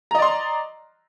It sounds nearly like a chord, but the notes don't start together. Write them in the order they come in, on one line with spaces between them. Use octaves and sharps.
A#5 D#5 D5 C6